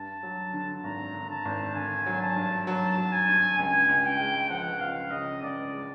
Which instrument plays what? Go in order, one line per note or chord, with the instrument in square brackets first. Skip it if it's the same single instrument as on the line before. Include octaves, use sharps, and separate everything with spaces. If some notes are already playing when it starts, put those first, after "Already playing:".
Already playing: [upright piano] G2 [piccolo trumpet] A5
[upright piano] F#3
D3
[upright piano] G#1 [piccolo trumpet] A#5
[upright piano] D3
[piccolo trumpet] A5
[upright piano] G#1
[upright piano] D3 [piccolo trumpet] G#5
[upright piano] F#3
[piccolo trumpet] A5
[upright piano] G2
[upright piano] F#3 [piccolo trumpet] A5
[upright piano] F#3
[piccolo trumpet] G#5
[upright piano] G2
[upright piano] C#2 [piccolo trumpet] G#5
[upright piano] C#2
[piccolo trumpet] G5
[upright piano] G#3
[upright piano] F3 [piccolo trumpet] F#5
[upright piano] C#2 [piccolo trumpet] F5
[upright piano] C#3 [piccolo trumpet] D#5
[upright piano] C#2 [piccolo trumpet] D5
[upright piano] G#3